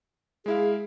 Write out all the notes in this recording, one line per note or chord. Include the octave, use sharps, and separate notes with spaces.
G#3 E4 G#4 F5